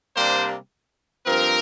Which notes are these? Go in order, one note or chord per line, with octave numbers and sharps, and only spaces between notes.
C3 G3 A#3 D4 C5
G2 F3 C4 A#4